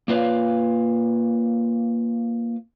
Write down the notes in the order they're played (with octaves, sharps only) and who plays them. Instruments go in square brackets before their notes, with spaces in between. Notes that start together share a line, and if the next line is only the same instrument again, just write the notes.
[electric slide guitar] A#3 F4 B4 C#5 F5